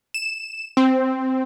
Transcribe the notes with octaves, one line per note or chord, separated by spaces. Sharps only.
E7
C4